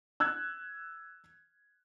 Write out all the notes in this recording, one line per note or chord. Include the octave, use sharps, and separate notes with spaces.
E6 F#6 G#6